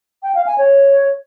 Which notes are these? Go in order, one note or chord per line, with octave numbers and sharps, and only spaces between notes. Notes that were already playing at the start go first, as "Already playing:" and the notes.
G5
F5
G#5
C#5